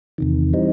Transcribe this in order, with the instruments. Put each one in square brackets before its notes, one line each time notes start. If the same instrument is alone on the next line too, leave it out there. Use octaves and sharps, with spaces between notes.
[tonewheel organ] E2 C3 D#3
E3 G3 C4 D#4